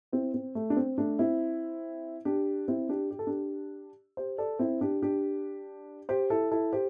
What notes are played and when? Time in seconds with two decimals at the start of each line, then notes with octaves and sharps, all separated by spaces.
0.12 C4 E4
0.34 C4
0.55 A3
0.70 D4
0.77 C4
0.98 A3 D4
1.19 C4 E4
2.25 D4 G4
2.68 C4 E4
2.89 D4 G4
3.11 G4
3.19 A4
3.27 D4 G4
4.17 G4 C5
4.38 A4 D5
4.59 C4 E4
4.81 D4 G4
5.02 D4 G4
6.09 G4 C5
6.30 E4 A4
6.51 E4 A4
6.73 G4 C5